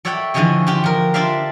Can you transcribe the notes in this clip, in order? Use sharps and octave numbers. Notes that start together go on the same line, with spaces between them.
A4 C#5 D5 E5 F#5 G5
D3 E3 F3 G#4 C#5 D#5
D4 F4 G4
F3 A#4
D4 F4 C5 D5 E5 F5